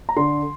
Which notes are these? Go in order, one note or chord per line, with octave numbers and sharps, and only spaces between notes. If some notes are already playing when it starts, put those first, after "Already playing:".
A#5
D3 C6